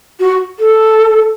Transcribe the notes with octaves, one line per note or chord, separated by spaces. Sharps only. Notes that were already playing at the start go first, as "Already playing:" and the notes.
F#4
A4